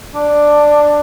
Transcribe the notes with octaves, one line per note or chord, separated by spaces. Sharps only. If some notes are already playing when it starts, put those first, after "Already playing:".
D4